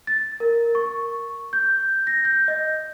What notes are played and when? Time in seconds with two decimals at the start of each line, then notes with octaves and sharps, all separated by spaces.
0.07 A6
0.40 A#4
0.75 C#6
1.53 G6
2.07 A#6
2.25 G6
2.48 D#5